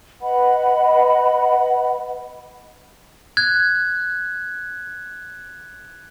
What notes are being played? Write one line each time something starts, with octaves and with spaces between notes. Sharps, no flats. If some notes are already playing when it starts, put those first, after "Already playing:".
B4 D#5 F#5 B5
F#6 G#6